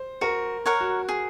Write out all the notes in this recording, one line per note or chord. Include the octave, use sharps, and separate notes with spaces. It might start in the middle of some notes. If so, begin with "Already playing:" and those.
Already playing: C5
F#4 A#4
A#4 C#5 F#5
F#4
G#4